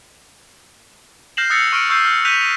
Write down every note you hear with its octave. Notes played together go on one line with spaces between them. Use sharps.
F6 G6 A#6 C7 E7 F#7
D#6 E6 F#6 A6 A#6 C#7
C#6 F6 C#7 D7
C#6 E6 G6 C7
F6
F#6 G6 B6 D#7 F7